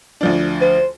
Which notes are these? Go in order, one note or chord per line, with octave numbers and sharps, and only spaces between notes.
D2 F3 D4
C5